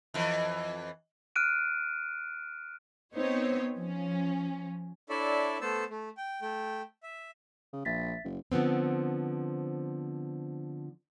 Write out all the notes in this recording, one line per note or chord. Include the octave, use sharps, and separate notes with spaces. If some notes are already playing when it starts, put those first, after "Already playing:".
F2 E3
F6 F#6 D7 D#7
B3 C4 D#4 C5 C#5
F3 C#4
D4 E4 A4 C#5 D5 E5
A3 B3 A4 C5 A5 E6
A3
G5
A3 G5
E5
C#3
A#1 E5 A6 B6
F#1
D3 F3 B3 C4